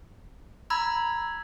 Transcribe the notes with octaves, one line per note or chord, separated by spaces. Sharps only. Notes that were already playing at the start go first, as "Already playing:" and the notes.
A#5 B5 E6 G#6